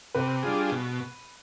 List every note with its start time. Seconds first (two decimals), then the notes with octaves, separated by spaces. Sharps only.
0.15 C3 B4
0.43 G3 D4 F4 G#4
0.72 B2